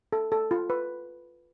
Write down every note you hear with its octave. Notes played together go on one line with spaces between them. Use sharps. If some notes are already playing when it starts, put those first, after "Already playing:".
A4
A4
F4
B4